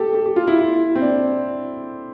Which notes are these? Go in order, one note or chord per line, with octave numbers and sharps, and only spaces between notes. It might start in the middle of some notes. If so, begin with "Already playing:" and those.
Already playing: G4 A4
G4
G4
F4
E4
E4
C4
D4